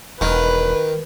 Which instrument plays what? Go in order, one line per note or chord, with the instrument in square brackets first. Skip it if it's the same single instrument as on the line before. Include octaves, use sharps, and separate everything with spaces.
[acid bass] E1 [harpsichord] D#3 [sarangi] B4